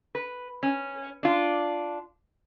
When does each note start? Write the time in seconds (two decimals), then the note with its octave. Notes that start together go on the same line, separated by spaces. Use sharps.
0.15 B4
0.63 C#4
1.23 D4 F4